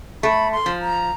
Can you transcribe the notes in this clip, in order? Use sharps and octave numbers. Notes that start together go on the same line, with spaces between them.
A3 B5
C6
F3
A#5